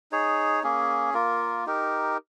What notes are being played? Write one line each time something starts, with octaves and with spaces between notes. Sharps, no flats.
D#4 G#4 C#5
A#3 C#4 G#4
A#3 F4 A#4
D#4 G4 A#4